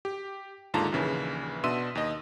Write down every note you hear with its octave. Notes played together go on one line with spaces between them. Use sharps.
G4
D#2 G#2 D3 F4 A5 A#5
A#1 D#2 C#3 E3
B2 D4 E5 C6 E6 D#7
D#2 D#5